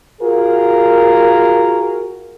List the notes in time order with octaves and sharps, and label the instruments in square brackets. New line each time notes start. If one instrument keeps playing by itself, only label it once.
[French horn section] F4 F#4 G#4 A#4